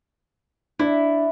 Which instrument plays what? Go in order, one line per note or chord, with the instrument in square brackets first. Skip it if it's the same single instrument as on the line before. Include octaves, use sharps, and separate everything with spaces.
[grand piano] D4 [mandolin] E4